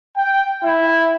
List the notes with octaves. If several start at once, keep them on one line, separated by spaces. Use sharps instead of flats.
G5
E4